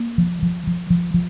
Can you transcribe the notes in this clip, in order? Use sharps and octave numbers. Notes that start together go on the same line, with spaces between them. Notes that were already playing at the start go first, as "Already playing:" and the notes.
Already playing: A#3
F3
F3
F3
F3
F3